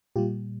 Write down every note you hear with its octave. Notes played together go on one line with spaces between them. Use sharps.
A#2 G3 F4 G4